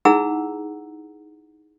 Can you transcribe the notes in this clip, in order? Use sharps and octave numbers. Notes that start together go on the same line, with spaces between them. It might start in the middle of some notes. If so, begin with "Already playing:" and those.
D#4 E4 G#4 F#5 A#5 E6